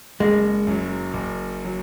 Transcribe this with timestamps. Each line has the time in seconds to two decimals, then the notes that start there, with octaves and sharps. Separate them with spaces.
0.20 F#1 G#3
0.67 F#2 F#3
1.14 F#1
1.65 F#3